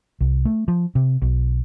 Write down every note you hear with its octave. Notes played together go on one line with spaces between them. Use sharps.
C2
A3
F3
C3
B1